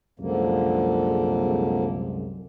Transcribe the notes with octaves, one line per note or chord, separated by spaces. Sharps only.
C2 F#2 D3 F3 G#3 A#3